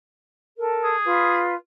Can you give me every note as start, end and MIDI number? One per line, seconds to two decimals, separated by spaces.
0.56 0.95 69
0.56 0.95 70
0.83 1.41 68
1.04 1.53 65
1.04 1.53 71